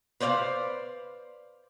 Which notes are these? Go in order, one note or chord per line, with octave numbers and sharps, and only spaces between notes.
B4 C5 D5 D#5 F5